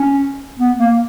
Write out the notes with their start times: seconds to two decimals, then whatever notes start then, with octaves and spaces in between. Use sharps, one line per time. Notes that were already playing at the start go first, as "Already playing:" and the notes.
Already playing: C#4
0.59 B3
0.78 A#3